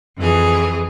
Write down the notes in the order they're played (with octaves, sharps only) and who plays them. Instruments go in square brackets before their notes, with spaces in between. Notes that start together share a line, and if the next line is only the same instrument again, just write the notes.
[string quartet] F2 E3 G#4